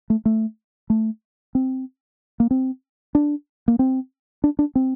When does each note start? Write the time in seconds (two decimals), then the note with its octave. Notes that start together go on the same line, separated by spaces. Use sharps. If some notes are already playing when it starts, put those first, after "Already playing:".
0.10 A3
0.25 A3
0.90 A3
1.55 C4
2.40 A#3
2.51 C4
3.15 D4
3.68 A#3
3.79 C4
4.44 D4
4.59 D4
4.75 C4